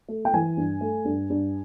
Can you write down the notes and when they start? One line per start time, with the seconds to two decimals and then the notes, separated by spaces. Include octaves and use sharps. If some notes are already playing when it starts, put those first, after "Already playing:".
0.08 A3
0.25 G5
0.33 E3 G#5
0.57 G2
0.81 A3
1.05 G2
1.30 G2